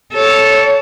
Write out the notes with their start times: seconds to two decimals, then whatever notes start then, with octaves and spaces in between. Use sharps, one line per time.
0.14 A4 C#5